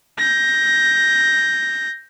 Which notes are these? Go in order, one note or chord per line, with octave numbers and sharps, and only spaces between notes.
G6 A#6